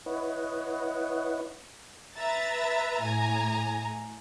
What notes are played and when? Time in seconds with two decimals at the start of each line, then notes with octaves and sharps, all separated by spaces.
0.06 E4 B4 C#5 D#5 F#5
2.16 B4 E5 A#5 A6
3.02 A2 G#5 A#5